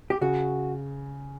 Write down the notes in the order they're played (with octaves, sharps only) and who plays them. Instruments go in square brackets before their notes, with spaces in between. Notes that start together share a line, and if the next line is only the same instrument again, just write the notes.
[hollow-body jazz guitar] G4
[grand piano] C#3 [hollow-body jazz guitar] F#4